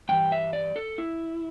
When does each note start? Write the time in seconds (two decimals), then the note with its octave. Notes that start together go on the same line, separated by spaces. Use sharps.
0.09 G2 E3 G3 G5
0.32 E5
0.53 D5
0.76 A4
0.98 E4